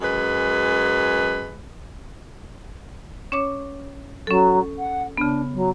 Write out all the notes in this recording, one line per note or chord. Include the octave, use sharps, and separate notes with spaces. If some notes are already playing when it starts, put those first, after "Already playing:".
F#2 G#3 B4
C#4 C#5 D6
F#3 C#4 A4
F#5
C#3 B3 D4
F#3